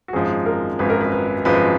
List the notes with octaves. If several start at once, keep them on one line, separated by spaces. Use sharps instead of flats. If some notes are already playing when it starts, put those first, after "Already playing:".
F#4
G#1 F#2 F3 G#3 G#4
A#4
G#1 F#2 F3 G#3 B4
A#4
B4
B4
G#1 F#2 F3 G#3 B4